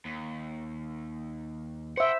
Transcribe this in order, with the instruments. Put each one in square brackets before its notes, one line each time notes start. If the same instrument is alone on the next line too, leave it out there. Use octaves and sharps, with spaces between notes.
[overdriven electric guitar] D#2
[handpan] C5 E5 [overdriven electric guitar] F#5 G5